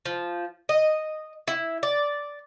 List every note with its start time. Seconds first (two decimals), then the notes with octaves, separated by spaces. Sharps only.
0.06 F3
0.69 D#5
1.48 E4
1.83 D5